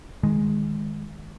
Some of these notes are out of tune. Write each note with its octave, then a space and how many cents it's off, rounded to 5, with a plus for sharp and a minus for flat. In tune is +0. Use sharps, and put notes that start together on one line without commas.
D#3 +0 G#3 +0